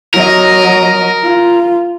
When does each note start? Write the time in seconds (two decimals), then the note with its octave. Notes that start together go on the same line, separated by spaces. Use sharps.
0.14 F#3 A#4 D#5
1.22 F4